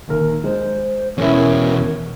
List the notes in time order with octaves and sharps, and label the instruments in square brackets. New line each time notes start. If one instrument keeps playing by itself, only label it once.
[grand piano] D#1 D#2 A#4
[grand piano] G#3 [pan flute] C5
[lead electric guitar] E2 B2 [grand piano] C#4 E4 [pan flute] A#4